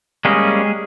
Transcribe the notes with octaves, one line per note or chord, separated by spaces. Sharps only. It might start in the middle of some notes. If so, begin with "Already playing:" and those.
G3 G#3 A#3 C#4 G#4